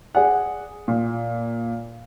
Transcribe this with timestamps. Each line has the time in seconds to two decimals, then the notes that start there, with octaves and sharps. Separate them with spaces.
0.15 G#4 D5 F#5
0.88 A#2